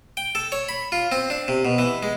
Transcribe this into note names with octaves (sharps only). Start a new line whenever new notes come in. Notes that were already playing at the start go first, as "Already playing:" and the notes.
G5
A4
C#5
B5
F4
C4
D4
C3
B2
E3
G#3